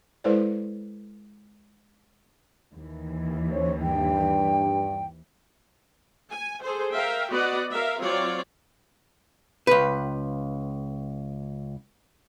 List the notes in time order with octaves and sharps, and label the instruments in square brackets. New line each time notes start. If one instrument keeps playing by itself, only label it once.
[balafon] G#3 E4 A4 B4 C5 D5
[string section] D#2 E3
[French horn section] C#4 C5 C#5
[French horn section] G2 [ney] G5
[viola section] G#5
G#4 A4 C5
A#4 E5 F5 G5
B3 F#4 D5 D#5 F#5
A#4 E5 F5
F#3 C4 F4 C#5 D5
[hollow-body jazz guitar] C#2 B4